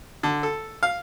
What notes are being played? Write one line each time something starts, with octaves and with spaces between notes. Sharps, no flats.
D3
A4
F5